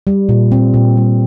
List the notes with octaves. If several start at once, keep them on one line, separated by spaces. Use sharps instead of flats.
G3
A#2
C4
A#2
G3